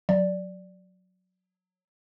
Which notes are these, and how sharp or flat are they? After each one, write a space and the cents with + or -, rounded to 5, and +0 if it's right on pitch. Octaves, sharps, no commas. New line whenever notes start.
F#3 -10 D5 +0